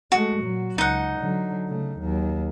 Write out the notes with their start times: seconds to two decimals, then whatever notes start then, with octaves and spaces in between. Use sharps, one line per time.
0.12 G#3 A3 F#4
0.40 A#2 F#3
0.78 C#2 D#4 F#5
1.19 D3 F#3
1.68 C#3 A3
1.99 D#2 F#3